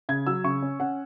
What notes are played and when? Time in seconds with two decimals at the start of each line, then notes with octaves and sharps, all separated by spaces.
0.09 C#3 G#6
0.27 F#3 E6
0.44 C#3 C#6
0.62 C#4
0.80 C#4 F#5